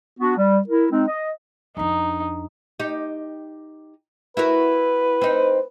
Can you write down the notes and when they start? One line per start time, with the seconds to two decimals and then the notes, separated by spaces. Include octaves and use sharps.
0.20 B3 D4 F#4
0.37 G3
0.68 E4 A#4
0.92 G#3 C4 D#4
1.08 D#5
1.77 F2 D4 D#4
2.80 D#4 G4
4.37 E4 F#4 A#4 B4
5.21 C4 D#4